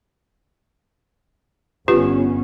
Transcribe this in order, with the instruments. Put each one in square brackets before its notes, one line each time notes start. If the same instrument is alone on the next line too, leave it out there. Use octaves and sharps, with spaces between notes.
[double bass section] G1 B3 C#4 [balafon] F4 G4 B4